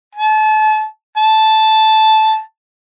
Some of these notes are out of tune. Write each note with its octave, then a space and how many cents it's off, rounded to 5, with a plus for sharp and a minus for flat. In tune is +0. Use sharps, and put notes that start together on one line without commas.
A5 -35
A5 -10